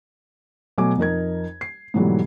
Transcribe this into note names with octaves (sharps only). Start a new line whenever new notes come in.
B2 F#3 A3 G#5 D6
F2 D#4 A#4 G#6
C7
G#2 B2 E3 F#3 G3 A3